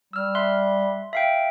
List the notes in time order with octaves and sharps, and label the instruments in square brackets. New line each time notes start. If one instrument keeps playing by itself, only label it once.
[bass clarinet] G3 [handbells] E6 F6
[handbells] E5 C6 F#6
E5 F5 G5